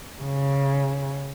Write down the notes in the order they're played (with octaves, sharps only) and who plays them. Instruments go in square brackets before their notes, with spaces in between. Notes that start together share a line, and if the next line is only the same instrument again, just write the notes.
[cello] C#3